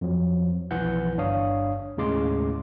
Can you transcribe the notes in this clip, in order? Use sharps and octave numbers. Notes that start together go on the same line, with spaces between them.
F2 F3 F#3
B1 E3 F3 F#5 G6
G1 G2 D4 C#5 F5 D#6
D#2 A2 C#3 G#3 C6 D6